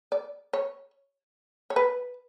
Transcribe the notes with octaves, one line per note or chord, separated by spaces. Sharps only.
D5
C#5
C#5
B4